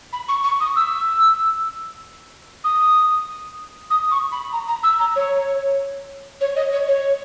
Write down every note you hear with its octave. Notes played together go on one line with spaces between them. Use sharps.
B5
C#6
C#6
D#6
E6
D#6
D#6
C#6
B5
A#5
A#5
E6
A#5
C#5
C#5
D#5
C#5
C#5